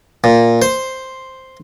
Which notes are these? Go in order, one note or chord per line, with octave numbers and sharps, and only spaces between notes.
A#2
C5